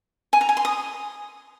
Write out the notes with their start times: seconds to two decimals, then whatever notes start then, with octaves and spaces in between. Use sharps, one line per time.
0.33 G#5
0.41 A#5
0.49 G#5
0.57 C6
0.65 D#6